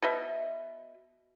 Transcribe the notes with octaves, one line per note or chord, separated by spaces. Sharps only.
B2 D#5 E5